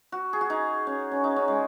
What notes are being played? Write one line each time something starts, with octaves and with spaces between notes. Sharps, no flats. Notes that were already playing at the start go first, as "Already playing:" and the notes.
F#4
G#4
F#4
D#4
C#4
C#4
D#4
C#4
G#3